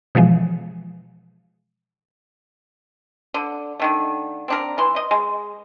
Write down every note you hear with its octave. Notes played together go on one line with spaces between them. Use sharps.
B2 E3 F3 G#3
D3
D3 D#3 A3
C4 D4 A#4
E3 C6
D#5
G#3